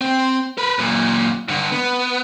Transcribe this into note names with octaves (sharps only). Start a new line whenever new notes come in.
C4
A#4 B4
F#2 A#2
G2 D3
B3